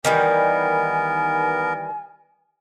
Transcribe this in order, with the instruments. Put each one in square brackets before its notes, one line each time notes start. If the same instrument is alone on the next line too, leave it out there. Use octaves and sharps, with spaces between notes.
[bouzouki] D#3 E3 G3 [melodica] B3 A#4 [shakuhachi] G#5